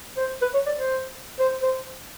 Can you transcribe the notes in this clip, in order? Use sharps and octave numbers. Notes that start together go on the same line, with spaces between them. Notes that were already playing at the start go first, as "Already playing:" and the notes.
C5
B4
C#5
D5
C5
C5
C5